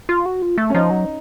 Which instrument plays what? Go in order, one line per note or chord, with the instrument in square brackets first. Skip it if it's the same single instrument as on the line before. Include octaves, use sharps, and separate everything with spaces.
[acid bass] F4
F#4
F4
A3
[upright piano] C#4
[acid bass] F3 [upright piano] D#4
[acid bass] F#3